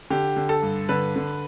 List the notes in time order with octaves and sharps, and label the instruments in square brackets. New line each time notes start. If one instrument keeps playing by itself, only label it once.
[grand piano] D3 G4
D3
A4
G2
D3 B4
D3